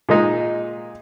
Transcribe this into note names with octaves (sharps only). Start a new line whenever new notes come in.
A#2 G#3 D#4